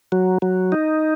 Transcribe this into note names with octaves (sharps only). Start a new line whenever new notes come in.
F#3
F#3
D#4